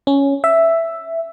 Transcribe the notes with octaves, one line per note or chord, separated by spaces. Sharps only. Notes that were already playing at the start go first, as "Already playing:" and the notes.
C#4
E5